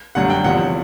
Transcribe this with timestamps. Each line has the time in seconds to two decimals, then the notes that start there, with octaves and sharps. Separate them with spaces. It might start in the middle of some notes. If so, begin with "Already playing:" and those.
0.15 G1 F#2 D3 G3 F#5
0.30 G5
0.44 F#1 E2 C3 F3 F#5